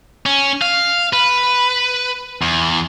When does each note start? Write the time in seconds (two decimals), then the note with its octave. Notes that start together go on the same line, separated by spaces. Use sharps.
0.26 C#4
0.62 F5
1.13 B4
2.42 E2